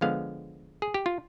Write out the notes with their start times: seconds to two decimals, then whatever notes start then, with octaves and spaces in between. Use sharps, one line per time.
0.01 D3 F3 G#3 B3 F5
0.82 G#4
0.94 G4
1.06 F4